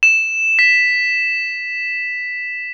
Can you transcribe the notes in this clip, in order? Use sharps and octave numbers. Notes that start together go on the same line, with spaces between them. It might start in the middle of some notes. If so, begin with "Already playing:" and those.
E7
B6